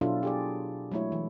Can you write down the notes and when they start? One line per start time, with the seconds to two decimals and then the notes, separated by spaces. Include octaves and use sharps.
0.01 B2 F#3 D4 E4 F4 A4
0.23 G4 G#4 D5
0.92 F#3 G#3 A3 E4 C#5
1.12 E3